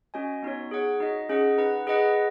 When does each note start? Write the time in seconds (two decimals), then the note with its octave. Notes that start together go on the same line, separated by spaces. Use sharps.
0.14 C#4 F#4 D#5 G#5
0.43 B3 D#4 F#4 C#5
0.71 G#4 C#5 F#5
1.00 D#4 F#4 D#5
1.29 C#4 G#4 D#5 F#5
1.58 D#4 B4 F#5
1.87 G#4 B4 D#5 F#5